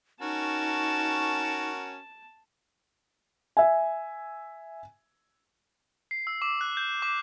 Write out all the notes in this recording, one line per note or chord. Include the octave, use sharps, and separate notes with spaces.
C#4 D#4 F#4 A#4 A5
E5 G#5
C7
E6
D6
F#6
G6
D6